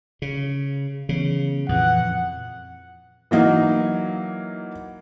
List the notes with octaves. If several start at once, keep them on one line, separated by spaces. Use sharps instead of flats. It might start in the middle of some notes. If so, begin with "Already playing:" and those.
C#3
C#3 E3 F#3 B3
F2 A#2 E3 F#5
E3 F#3 A#3 D#4